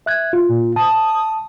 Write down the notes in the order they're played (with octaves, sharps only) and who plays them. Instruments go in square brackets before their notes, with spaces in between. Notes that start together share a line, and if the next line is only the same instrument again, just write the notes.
[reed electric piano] E5 F#6 G#6
F4
[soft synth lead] A#2
[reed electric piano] A5 [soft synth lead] D#6